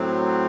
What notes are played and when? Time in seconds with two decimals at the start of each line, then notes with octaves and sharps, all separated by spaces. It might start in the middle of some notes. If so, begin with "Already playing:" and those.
Already playing: A2 F#3 C4